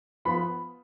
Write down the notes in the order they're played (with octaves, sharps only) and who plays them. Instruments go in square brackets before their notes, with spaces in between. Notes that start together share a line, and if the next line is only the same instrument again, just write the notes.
[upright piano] F3 B3 B5